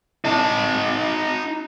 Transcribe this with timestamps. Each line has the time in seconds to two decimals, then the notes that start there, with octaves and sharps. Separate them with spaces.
0.25 D#4 A5